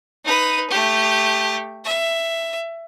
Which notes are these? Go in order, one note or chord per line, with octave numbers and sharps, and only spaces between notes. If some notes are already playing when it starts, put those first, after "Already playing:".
D#4 B4
A3 G4
E5